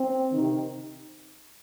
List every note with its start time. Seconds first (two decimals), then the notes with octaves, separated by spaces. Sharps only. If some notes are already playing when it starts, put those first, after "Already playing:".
Already playing: C4
0.32 C3 D#3